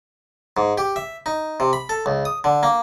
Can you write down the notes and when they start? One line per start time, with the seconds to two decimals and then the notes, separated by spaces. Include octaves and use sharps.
0.57 G#2
0.78 G4
0.96 E5
1.26 D#4
1.60 C3
1.73 B5
1.89 A4
2.06 C#2
2.25 D#6
2.44 D3
2.63 A#3